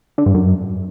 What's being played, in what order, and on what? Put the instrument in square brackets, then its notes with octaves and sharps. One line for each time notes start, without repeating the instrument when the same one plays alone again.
[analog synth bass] D3
G2
F#2